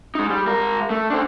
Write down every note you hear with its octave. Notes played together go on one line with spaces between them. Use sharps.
G#3 D#4
G3
G#3 A#4
A3
D4 C5